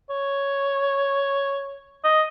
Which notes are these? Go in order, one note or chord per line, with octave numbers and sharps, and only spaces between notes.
C#5
D#5